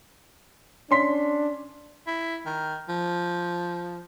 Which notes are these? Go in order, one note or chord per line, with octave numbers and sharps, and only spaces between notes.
C#4 D4 C6 B6
E4
D#3
F3